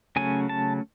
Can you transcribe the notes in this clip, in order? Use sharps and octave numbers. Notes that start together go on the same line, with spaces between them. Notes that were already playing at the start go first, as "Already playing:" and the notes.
C#3 F#3 A3 C#4 G#5
A5